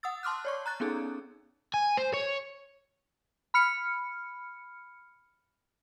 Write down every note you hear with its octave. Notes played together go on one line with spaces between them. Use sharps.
F#5 D#6 E6 A6
A5 C6 D6 F6 F#6
C#5 D5 C#6
A#5 F#6 A6
B3 C#4 D#4 G#4 A4
G#5
C5
C#5
B5 F6 C#7